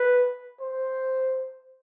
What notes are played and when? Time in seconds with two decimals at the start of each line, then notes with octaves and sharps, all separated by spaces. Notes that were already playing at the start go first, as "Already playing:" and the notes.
Already playing: B4
0.61 C5